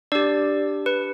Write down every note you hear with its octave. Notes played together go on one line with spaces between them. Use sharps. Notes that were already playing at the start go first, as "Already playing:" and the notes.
D4 G4 D5
B4